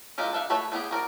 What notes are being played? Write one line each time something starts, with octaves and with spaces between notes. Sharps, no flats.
G#3 E4 F4 G4 A#4
D4 A4 B4 E5 F5
A3 B4 C#5 A5 B5
G3 B3 C4 G4 G#4
F#4 A#4 D5